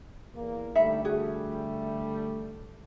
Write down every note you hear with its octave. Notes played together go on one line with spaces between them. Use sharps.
E2 A#2 A#3
D3 G3 A3 D#4 E5 B5
F#4 G#4